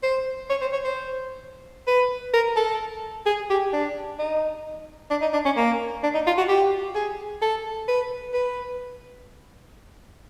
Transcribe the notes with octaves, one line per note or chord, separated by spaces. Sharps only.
C5
C#5
C5
C#5
C5
B4
A#4
A4
G#4
G4
D4
D#4
D4
D#4
D4
C#4
A#3
D4
D#4
F4
F#4
G4
G#4
A4
B4
B4